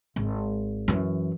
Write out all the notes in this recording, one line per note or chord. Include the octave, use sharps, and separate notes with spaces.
G#1
F#2 E3